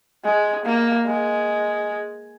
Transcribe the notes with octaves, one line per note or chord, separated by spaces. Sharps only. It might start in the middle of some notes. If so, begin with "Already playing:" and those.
G#3
A#3
G#3